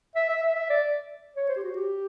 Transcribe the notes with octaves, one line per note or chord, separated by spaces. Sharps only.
E5
E5
E5
E5
D5
C#5
C5
G4
F#4
G4